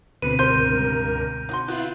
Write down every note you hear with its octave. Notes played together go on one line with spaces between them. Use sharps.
D2 B2 D3 C4 B4 D#7
C#2 G2 A#4 C5 C6 G6
D#4 F#4 C6
B3 E4 F4 F#6